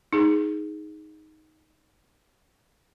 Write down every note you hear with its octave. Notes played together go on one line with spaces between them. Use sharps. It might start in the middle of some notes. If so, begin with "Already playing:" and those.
D#4 G#4